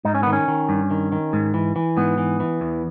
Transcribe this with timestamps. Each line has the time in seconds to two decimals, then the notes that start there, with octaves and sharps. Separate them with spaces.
0.05 G#2 D#4
0.15 C#4
0.23 D#3 B3
0.33 C#4
0.48 D#3
0.69 G2
0.91 D#3
1.12 D#3
1.33 G#2
1.54 E3
1.76 E3
1.97 G#2 B3
2.18 E3
2.40 E3
2.61 E2